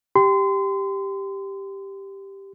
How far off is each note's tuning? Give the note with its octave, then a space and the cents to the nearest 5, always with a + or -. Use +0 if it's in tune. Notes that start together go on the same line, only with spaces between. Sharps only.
G4 +0 C6 -30